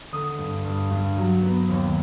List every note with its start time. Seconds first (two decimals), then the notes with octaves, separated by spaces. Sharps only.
0.12 D3 D#6
0.39 G2
0.64 G2
0.91 G2
1.17 F#3
1.43 B3
1.69 D#2